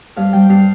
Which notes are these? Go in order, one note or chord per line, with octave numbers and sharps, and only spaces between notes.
G2 F5
G3 G5
G2 F5